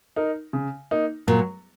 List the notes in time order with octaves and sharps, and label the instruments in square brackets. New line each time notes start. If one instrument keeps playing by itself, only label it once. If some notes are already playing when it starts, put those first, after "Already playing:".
[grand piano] D#4 A#4
C#3
A#3 D#4
[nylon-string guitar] A#2 [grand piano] F#3